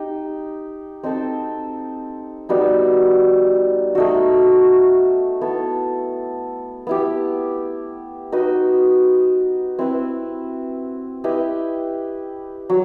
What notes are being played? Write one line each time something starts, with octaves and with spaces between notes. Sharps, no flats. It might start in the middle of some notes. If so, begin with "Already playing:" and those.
Already playing: D#4 G4 D#5
C4 D#4 A4 C5
G3 B3 D#4 F#4
A3 D#4 F#4
B3 E4 A4
B3 E4 G4
D#4 F#4 B4 D#5
C4 E4 B4 E5
E4 G4 B4 D#5
F#3